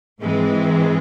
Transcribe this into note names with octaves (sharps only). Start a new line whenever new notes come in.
G#2 E3 G#3 C4